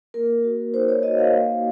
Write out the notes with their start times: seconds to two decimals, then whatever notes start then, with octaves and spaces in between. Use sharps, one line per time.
0.14 A#3 A#4
0.44 F#4
0.74 D#4 C5
0.88 C#5
1.03 F#4 D#5
1.19 F5
1.33 A#3